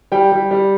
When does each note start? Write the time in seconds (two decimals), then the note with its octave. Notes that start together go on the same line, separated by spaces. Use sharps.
0.12 G3 G5
0.32 G3
0.51 G3